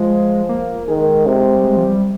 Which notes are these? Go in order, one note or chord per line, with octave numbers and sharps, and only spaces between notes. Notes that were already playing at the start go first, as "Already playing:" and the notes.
Already playing: F3 G#3
A#3
D#3 G#3
C3
G3
G#3
F3
G3